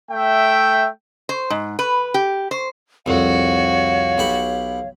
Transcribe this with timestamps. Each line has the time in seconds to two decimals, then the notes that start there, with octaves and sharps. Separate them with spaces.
0.11 A3 E5 G5
1.29 C5
1.50 G#2
1.79 B4
2.14 G4
2.51 C5
3.06 C2 F2 F#4 C#5 F5
4.18 B1 G4 B5